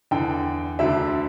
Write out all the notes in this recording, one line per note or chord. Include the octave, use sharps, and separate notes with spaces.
E2 D3 G5
D2 D3 E5